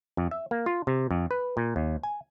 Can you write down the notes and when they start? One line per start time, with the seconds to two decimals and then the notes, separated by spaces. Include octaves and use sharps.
0.17 F2
0.31 E5
0.51 A#3
0.66 F4
0.87 C3
1.11 F2
1.31 B4
1.57 A#2
1.76 D#2
2.03 G#5